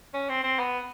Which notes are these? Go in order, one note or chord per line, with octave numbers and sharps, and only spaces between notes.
C#4
C4
C4
B3